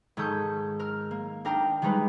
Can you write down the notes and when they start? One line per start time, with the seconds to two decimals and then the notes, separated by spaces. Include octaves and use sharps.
0.17 G#2 D#3 A4 C#6 D#6 G6
0.79 A#4 F6
1.11 A#3
1.45 D4 D#4 A#4 G5 A#5
1.82 D#3 G3 G#3 D#4 B4